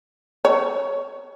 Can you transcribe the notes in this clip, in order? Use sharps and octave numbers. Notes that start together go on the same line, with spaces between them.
C#5